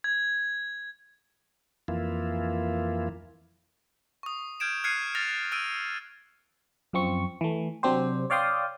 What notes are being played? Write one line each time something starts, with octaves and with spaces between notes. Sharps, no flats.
G#6
F2 E3 A#3 E4 F4
C#6 D#6
F6 G6 G#6 D7 E7
F6 F#6 G#6 C7 C#7 D#7
F6 A6 A#6 F7
E6 F6 D7 D#7
F#2 F3 C4 C#6
E3 A3
C3 F#3 C4 D4 G4 C5
C#5 D5 F5 G5 C6 D#6